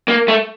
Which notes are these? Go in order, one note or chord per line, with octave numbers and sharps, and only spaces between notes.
A#3
A3